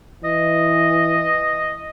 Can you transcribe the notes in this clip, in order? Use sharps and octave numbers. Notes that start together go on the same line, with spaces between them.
E3 D#5